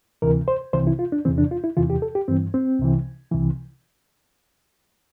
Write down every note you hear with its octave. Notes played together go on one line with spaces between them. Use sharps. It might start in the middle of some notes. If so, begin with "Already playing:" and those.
D2 C3 E3 A#4
C5
C2 C3 E3 C5
E4
F4
D4
E2 C3 E3 C4
D4
F4
E4
E2 C3 E3 F4
G4
A4
G4
G2 E3 C4
C4
C2 C3 E3
C2 C3 E3